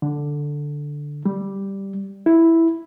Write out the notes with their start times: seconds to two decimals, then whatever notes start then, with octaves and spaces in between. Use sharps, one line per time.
0.02 D3
1.26 G3
2.26 E4